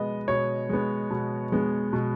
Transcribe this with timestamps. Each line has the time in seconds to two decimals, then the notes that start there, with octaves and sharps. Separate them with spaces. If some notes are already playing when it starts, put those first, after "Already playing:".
Already playing: B2 G#3 B3 D#5
0.28 B2 C#5
0.69 G#3 B3
1.11 B2
1.52 G#3 B3
1.93 B2